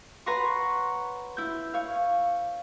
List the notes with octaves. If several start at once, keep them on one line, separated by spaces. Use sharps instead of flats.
B4 C#5 F#5 A#5 C6 C#6
E4 G6
C#5 F5